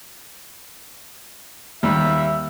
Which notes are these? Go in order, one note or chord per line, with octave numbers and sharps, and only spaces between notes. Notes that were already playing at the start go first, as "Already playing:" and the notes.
D#2 G3 E5